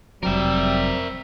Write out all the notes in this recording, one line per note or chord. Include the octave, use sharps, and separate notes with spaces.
F1 F#3 G3 C4 A#4 E5